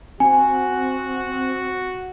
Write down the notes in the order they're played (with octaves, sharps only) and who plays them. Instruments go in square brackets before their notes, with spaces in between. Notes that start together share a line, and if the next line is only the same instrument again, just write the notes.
[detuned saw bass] C4 [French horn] F#4 [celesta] G#5